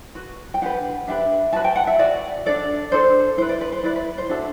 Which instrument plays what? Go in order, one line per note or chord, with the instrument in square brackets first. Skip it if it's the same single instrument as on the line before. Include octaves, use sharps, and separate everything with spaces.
[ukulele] F#4 B4
G5
D4 G4 B4 F#5
D4 G4 B4 E5
F#4 B4 A5
G5
F#5
E5
F#4 B4 D5
D4 A4 D5
D4 A4 C5
E4 B4 C5
D5
B4
C5
E4 B4 D5
B4
C5
D4 F#4 A4 E5